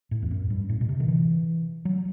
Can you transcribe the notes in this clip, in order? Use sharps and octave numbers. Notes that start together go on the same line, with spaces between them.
A2
E2
F#2
G2
A2
B2
C3
D#3
E3
F#3